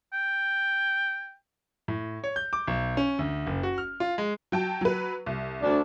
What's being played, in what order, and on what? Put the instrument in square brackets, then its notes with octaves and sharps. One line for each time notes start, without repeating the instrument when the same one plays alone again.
[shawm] G5
[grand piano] A2
C#5
G6
D6
B1
C#4
D2
F#1
F#4
F6
F4
G#3
[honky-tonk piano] F#3 G5 A5
F#3 B4
C2
[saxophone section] D2 D4